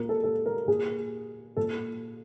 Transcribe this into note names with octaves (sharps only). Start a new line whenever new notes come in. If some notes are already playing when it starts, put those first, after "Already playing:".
Already playing: A#2 A#4
A4
A4
A#4
A#2 G#4
A#2 A4